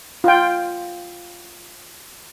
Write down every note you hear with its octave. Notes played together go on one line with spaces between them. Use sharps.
F4 G5